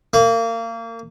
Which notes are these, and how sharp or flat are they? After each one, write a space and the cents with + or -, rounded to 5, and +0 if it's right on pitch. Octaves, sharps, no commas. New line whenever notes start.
A#3 -30